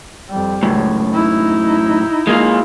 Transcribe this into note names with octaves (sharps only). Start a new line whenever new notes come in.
F2 G3
C#2 F#2 A2
D#4 E4
G#3 A#3 F4